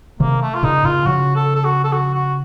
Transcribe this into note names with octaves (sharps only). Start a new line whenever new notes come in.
C3 D#3 A#3
A3
F4
A#2 C#3 D#4
A#2 C#3 F4
C#3 F3 F#4
A4
A4
F#4
A4
F#4
F#4